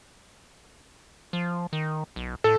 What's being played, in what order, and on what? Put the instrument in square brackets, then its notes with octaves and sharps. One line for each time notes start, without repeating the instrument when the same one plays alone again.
[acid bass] F3
D#3
B1
[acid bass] A2 [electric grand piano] A4